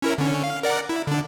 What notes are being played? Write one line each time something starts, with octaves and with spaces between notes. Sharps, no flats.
C#4 E4 A#4
D3 C#4
F5
A#4 D5 F#5
E4
D3 D4